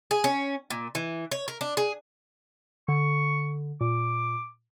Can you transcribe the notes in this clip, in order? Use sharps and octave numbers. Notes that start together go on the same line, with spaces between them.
G#4
C#4
A#2
E3
C#5
A#4
D4
G#4
D3 C#6
A#2 D6